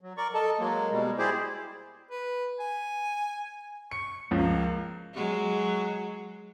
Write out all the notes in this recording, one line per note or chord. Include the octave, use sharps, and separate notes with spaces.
F#3
A#4 D5 C#6
A4 D#5 A5
F#3 G#3 A#3
B2 G3 G#3
E4 G4 G#4 C5 D5
B4
G#5
C#6 C#7
C#2 F3 A#3
F#3 G#3 F#4